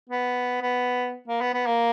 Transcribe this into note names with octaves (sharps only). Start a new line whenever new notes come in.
B3
B3
A#3
B3
B3
A#3